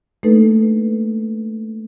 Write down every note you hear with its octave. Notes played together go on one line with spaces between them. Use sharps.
A3 A#3 D4 D#4 A4 B4